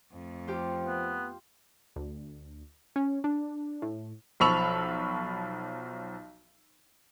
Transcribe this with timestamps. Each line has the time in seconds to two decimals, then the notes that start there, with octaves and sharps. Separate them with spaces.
0.12 F2 A3
0.48 F3 F4 G4
0.85 B3
1.96 D2
2.96 C#4
3.24 D4
3.82 A2
4.40 B1 F3 B5 C#6 E6 F7